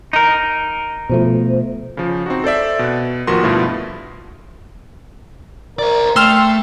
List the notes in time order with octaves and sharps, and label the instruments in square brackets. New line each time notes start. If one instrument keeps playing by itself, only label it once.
[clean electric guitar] D#4 A#4
[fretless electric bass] B2 F3 A3 [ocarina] C5
[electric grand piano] C#3 F3
C4 D#4 F#4
A4 C5 D5 E5
B2 F#6
A1 D#2 F3 F#4 A#4 C6
G2 B2 F3 A3 E4
[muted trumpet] A#4 [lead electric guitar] C5 D5
[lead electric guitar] A3 [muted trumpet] G5 [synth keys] C6 E6 F6